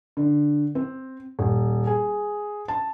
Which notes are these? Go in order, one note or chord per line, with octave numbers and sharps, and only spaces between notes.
D3
C4
D#1
G#4
A5